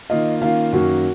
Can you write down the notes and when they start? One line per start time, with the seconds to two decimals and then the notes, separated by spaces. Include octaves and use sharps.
0.10 D#3 A#3 F4 D#5
0.41 D#3 A#3 C#4 F4 F5
0.73 F#2 D#3 A#3 C#4 F#4